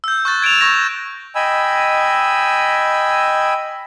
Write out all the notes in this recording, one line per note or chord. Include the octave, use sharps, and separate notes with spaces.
E6 G6
C#6 F#6 A6
G#6 D7 E7 F7
C#6 G#6 A#6
D#5 G5 G#5 B5 E6